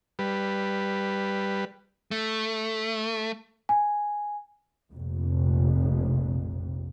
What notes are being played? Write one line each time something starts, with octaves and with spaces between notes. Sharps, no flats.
G3 B4
A3
G#5
F1 A#1 F2